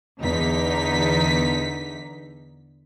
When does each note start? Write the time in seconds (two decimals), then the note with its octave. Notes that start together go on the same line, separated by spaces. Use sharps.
0.20 E2 D3 D#4 B6